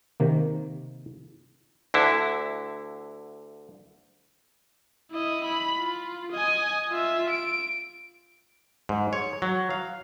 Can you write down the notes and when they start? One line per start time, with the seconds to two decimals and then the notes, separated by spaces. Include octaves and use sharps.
0.20 C3 D#3 A#3
1.94 D2 D3 E4
5.11 E4 D#5
5.44 B5
5.79 F4
6.32 D#5 G#5
6.90 F4 E5
7.30 D7
8.89 G#2
9.13 C#5
9.42 F#3
9.70 F5